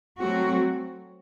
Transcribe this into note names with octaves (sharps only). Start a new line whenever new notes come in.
F#3 A3 C4 F#4